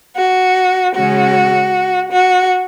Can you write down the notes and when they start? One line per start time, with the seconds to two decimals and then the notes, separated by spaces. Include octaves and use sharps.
0.16 F#4
0.95 C#3 G#3 C#4 F#4
2.11 F#4